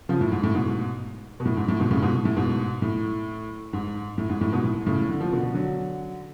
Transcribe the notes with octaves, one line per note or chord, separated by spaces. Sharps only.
C#3 F3
A2
G#2
A2
G#2 B2
B2
A2
G#2
A2
G#2 B2
A2 C#3
G#2 B2
A2
G#2 B2
A2
G#2
A2
G#2
A2
G#2 B2
A2
A2 C#3
D3
F3
B2 D3
D3 F#3